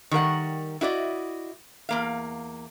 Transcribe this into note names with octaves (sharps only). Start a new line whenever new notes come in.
D#3 G3 A#4 F#5
E4 F#4 D5 D#5
E2 A#3 F5